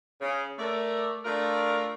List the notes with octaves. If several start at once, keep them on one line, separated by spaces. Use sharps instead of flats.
C#3
A3 A#4 D5 E5
A3 D4 F4 A#4